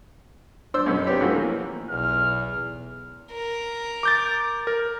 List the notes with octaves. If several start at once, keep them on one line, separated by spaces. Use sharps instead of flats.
D4 C5 C6 E6
F#2 B2 G#3 B3 C#4
B3 C4 D4 G4 C#5
E3 F3 A3 B3 C#4 F#4
E3 A#3
B1 E2 F6
A#4
D6 G6 A6
A#4